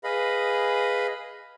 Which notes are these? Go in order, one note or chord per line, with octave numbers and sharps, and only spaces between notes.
G#4 B4 D#5 F5 B5